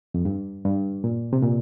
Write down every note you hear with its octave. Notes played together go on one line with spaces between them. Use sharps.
F2
G2
G2
A#2
C3
A#2